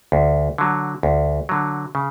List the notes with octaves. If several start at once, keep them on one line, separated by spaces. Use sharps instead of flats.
D2
D3 F#3
D2
D3 F#3
C#3